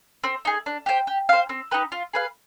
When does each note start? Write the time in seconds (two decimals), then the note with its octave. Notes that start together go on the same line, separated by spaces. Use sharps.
0.24 C4
0.45 D#4 G#4
0.66 D4
0.86 G4 C5 G5
1.07 G4
1.29 C5 F5
1.49 C4
1.71 D#4 G4 B4
1.92 F4
2.13 G#4 B4 F5